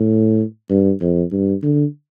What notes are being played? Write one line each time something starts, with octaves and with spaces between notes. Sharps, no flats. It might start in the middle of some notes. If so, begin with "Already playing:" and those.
Already playing: A2
G2
F2
G2
D3